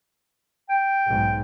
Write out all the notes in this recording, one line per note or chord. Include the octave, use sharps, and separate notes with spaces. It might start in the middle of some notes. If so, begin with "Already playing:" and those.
G5
B1 G#2